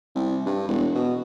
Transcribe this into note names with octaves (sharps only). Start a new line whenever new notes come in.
C2
G2
E1
B2